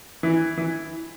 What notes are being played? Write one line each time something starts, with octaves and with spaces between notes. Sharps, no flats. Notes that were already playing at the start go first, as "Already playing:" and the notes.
E3
E3